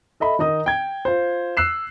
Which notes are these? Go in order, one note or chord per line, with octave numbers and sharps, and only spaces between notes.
A4 D#5 E5 B5
D#3 D#4 D#5 D#6
G5 G#6
F4 C5
E6 F#6 C7 E7